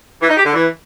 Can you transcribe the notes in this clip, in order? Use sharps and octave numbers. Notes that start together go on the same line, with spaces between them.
E3
D#4
G4
D3
E3